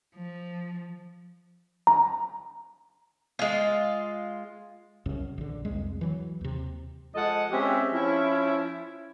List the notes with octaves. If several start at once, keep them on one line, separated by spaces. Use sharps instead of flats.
F3
A#5
G#3 F4
C2 F#2 C#3
A#1 D3
C2 F2 G#3
E3 F#3
D#2 C3
F3 G#3 A4 D#5 F#5
G#3 C4 C#4 G4 E5
F3 C#4 E4